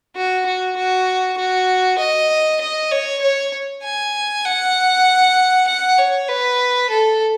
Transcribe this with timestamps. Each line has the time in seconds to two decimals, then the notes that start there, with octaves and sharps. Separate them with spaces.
0.16 F#4
0.46 F#4
0.77 F#4
1.38 F#4
1.99 D#5
2.61 D#5
2.91 C#5
3.22 C#5
3.83 G#5
4.45 F#5
5.68 F#5
5.98 C#5
6.28 B4
6.90 A4